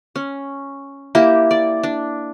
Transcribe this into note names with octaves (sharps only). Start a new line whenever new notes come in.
C#4
A#3 E4 G4
D5
D4